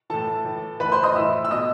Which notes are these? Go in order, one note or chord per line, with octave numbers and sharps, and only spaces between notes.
A2 E3 A4 A5
A2 E3
A2 E3 B4 B5
C5 C6
D#5 D#6
A2 E3 E5 E6
E6
B2 D#5 D#6